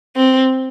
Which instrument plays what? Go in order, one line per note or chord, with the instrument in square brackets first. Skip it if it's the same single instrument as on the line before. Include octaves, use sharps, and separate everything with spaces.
[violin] C4